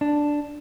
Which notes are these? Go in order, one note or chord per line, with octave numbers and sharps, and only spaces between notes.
D4